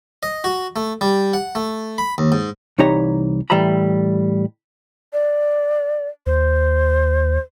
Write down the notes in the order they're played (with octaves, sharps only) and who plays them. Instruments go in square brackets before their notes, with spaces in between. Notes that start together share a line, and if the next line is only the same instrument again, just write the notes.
[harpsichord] D#5
F#4
A3
G3
F#5
A3
B5
D#2
G#2
[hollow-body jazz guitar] C2 E3 D#4 G4 C#5 A#5
A2 E3 G3 E5 A#5 B5
[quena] D5
[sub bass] D#2 [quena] C5